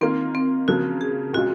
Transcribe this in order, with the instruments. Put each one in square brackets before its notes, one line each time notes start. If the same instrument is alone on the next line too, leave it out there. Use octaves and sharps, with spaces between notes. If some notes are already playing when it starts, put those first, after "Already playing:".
[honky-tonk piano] D#3 A#3 F4 [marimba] C4
[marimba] C4
[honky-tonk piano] C#3 F3 A#3 [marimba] F#4
[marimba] G#4
[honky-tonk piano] A#2 G#3 C#4 F4 [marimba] F#4